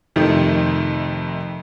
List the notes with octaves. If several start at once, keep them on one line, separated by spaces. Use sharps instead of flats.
F2 C3 D#3 A3 D#4